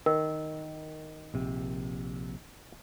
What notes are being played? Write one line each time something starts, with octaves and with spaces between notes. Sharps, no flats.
D#3 A#4
A#1 C3